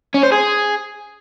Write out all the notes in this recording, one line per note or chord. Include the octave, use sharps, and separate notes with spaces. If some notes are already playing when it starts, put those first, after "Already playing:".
C#4
C5
G#4